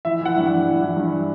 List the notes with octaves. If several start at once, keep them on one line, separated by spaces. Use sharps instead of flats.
E3 E5
E3 F#5
G2
G2 F#5
E3
E3
G2